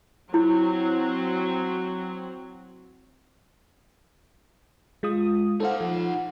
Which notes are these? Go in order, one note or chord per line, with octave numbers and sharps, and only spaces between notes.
F#3 C4 E4
G#3 F4 D#6
D#4 A4 C5 F5 F#5
F3